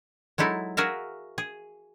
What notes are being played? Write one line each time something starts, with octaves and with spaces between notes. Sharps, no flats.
F#3 G#3 D#4 E4 A4
F#4 G#4 A#4 E5 F5
G#4